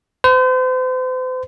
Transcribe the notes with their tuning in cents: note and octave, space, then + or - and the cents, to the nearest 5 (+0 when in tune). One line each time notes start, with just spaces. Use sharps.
C5 -40